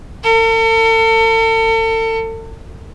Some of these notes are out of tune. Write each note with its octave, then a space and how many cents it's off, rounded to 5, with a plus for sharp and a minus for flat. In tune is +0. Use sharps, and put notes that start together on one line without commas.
A4 +40